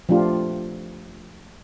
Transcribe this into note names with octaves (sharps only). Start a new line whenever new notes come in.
F3 A3 D4 F4 G4